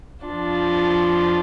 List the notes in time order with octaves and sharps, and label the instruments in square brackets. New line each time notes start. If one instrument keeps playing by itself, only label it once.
[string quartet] F2 F3 D4 F4